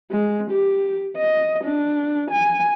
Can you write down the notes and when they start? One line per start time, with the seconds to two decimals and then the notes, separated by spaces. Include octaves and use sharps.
0.11 G#3
0.51 G4
1.17 D#5
1.64 D4
2.31 G#5